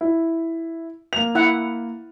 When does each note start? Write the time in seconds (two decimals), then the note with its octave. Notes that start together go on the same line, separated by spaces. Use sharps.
0.01 E4
1.13 A#3 F7
1.35 E4 F#5